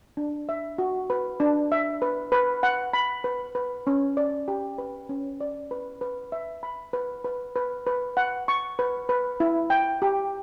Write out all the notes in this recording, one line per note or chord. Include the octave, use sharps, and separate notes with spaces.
D4
E5
F#4
B4
D4
E5
B4
B4
F#5
B5
B4
B4
C#4
D5
G4
B4
C#4
D5
B4
B4
E5
B5
B4
B4
B4
B4
F#5
C#6
B4
B4
E4
G5
G4